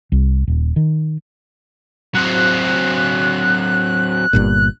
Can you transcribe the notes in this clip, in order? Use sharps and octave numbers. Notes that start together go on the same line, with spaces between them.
C2
D#1
D#3
F#3 C4 F#6
G1 G2 A#2